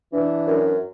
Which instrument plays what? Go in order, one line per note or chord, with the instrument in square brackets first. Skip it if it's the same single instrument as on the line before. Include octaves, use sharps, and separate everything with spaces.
[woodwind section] E3 [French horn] D4
[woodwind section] F#2